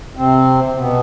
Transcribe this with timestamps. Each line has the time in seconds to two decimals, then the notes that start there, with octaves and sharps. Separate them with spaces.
0.17 C3 C4
0.77 B2 B3